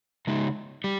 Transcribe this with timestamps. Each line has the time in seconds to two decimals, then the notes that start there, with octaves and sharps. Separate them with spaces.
0.27 C#3 G#3 D#4
0.84 G3